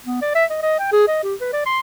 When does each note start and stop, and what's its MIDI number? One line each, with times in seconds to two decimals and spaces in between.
0.06 0.19 59
0.22 0.34 74
0.35 0.45 76
0.50 0.58 75
0.62 0.78 75
0.79 0.92 79
0.92 1.07 68
1.08 1.21 75
1.23 1.34 67
1.41 1.48 71
1.53 1.63 74
1.66 1.80 84